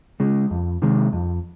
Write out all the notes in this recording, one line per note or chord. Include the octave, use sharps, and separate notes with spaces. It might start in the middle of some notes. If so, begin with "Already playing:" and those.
C#3 G#3
F2
C3 D#3 G#3
F2